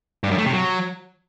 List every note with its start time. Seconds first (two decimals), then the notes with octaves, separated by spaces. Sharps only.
0.24 G2
0.31 F#2
0.38 A3
0.46 C3
0.53 F#3